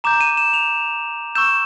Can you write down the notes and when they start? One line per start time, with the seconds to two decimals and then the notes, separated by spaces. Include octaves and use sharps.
0.04 A#5 D6 G6 E7
0.21 D#7
0.37 E7
0.53 F7
1.35 C#6 E6 G6 E7